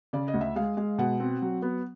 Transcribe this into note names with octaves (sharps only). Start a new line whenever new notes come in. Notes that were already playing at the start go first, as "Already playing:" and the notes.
C#3 D5
D#5
D2
E5
G#3 F5
G#3
B2 F#5
C4
F#3
B3